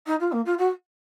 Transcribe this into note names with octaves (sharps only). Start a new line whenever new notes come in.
D#4
F4
A#3
F4
F#4